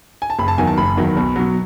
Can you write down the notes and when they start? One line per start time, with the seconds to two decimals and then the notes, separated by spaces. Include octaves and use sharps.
0.22 G#5
0.30 A5
0.39 F#1 B5
0.48 A5
0.58 E2 D#3 F#3 G#5
0.67 A5
0.78 F#1 B5
0.97 E2 D#3 F#3
1.17 B1
1.36 B2 F#3